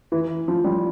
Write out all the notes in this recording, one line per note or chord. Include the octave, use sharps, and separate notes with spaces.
E3
F3
G3